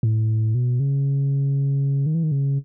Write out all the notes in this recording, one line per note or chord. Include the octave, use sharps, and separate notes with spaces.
A2
B2
C#3
D#3
E3
D#3
C#3